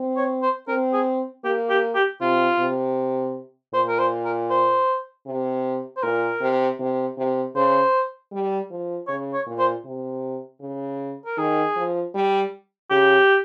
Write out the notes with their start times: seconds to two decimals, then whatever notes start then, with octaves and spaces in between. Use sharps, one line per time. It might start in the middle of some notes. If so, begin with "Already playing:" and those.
Already playing: C4
0.17 C#5
0.42 C5
0.68 C4 A#4
0.93 G#4
1.44 A#3 G4
1.70 G4
1.95 G4
2.21 C3 F4
2.59 C3
3.74 A#2 C5
3.89 A#4
3.99 C5
4.25 A#4
4.50 C5
5.26 C3
5.97 C5
6.03 A#2 A#4
6.41 C3
6.79 C3
7.18 C3
7.55 C#3 C5
8.32 G3
8.71 F3
9.08 C#3 C#5
9.34 C#5
9.47 A#2
9.59 C5
9.85 C3
10.61 C#3
11.26 A#4
11.38 D#3 G#4
11.76 F3
12.14 G3
12.90 C#3 G4